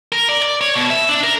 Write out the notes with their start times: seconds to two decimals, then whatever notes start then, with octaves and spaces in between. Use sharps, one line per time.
0.12 A#4
0.29 D5
0.42 D5
0.61 C#5
0.76 B2
0.90 E5
1.09 D4
1.24 A#4